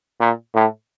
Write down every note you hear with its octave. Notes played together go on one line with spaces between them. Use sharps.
A#2
A2